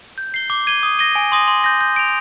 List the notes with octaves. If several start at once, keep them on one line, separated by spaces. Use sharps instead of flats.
G6
C7 G7
D6
G#6 D#7 G7
D#6
A#6 D#7 G7
G#5
C6 D#6 A#6 D#7
C6
G6 A#6
G6
D7 F7